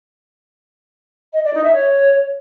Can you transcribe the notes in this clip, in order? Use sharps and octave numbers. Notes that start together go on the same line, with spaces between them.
D#5
D5
D#4
E5
C#5